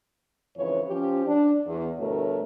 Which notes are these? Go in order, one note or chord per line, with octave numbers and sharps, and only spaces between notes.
F2 G#2 C#3 E3 B4 C#5
F3 C#4 G4
D4
E2
D2 G2 B2 A3 A#4 C#5